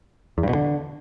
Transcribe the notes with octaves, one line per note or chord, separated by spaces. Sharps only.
E2
G2
B2
D3